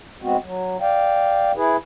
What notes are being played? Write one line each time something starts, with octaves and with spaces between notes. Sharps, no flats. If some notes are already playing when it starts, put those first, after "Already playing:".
G#3 B3 C4 F#4
F#3
D5 F5 G5
E4 G#4 B4